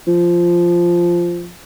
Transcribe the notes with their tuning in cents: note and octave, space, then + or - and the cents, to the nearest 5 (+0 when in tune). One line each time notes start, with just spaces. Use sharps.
F3 -10